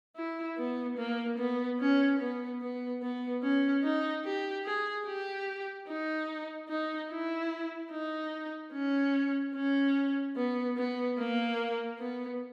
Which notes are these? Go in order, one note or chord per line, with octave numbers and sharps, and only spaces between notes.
E4
B3
A#3
B3
C#4
B3
B3
B3
C#4
D#4
G4
G#4
G4
D#4
D#4
E4
D#4
C#4
C#4
B3
B3
A#3
B3